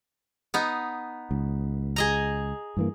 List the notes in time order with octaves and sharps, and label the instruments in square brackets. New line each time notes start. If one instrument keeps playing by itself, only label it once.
[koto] B3 D#4
[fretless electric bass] C#2
[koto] G#4 D#5 A#5
[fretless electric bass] G2 E3 A#3